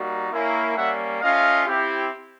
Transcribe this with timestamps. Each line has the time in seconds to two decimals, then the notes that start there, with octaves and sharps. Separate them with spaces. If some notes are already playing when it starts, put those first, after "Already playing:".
Already playing: G3 A#3 D#4 F#4
0.32 A#3 C#4 E4
0.77 G3 A#3 C#4 E5 F#5
1.22 A3 C#4 F4 D#5 F5
1.67 C4 E4 G4